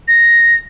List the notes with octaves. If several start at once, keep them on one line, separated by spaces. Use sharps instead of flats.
A#6